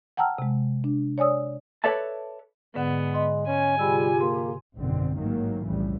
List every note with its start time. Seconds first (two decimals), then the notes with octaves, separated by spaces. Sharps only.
0.17 F#5 G5 A5 A#5 E6 F6
0.38 C3 G#3
0.84 D4
1.18 C#5 D5 G#5 D#6 E6
1.84 A4 B4 C#5 D5 E5 A5
2.75 G#2 D3 G#3 B3 F#5
3.14 D#5 C6
3.47 C#4 G#5
3.79 C3 G3 F4 G4 G#4 B5 E6
4.21 A#3 C6
4.77 G#1 F#2 B2 D3 C4
5.17 A1 G#2 D#3 F#3 A#3
5.65 B1 F2 A2 C#3 E3 G3